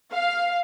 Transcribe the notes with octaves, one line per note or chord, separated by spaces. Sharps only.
F5